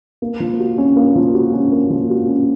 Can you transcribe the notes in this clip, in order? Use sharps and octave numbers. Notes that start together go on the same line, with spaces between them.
A#3
F3
F#4
C#4
A#3
F3
F#4
C#4
A#3
F3
F#4
C#4